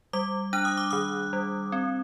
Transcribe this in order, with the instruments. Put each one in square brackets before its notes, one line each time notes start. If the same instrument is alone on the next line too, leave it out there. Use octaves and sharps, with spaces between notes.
[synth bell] G3 D6
D4 F#6
D#6
D6
D#3 D#6
G3
C4